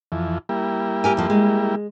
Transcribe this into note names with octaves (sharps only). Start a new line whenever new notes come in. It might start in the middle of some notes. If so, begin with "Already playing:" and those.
F2 E3
G3 A#3 E4
G4 A#4 G#5
F2 F3
G#3